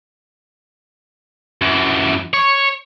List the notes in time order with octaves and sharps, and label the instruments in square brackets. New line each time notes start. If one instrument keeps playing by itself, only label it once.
[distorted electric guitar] F#2 E3
C#5